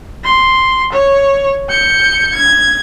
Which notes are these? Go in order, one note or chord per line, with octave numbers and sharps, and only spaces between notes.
C6
C#5
G6 C#7
G#6